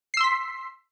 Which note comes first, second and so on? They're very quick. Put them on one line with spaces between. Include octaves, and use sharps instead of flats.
C7 E6 C6 B6